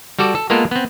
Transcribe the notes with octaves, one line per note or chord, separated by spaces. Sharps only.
G3 F#4 A4 D5
A4
G#3 A#3 B3 F4 A4 A#4
B3 C4